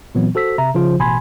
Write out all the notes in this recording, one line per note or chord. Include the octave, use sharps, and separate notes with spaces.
A#2 E3 F#3 B3 C4
F#4 A4 C5 E6 B6
C3 E5 A#5
C#3 F3 F4 C5
A1 B2 G#5 B5 C6 G#6